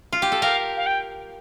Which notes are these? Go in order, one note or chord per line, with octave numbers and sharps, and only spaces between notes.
F4
G4
A4
G4 A#4 F5
F5
G5